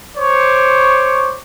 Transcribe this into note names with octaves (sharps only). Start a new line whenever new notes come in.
C5 C#5 C#6 D6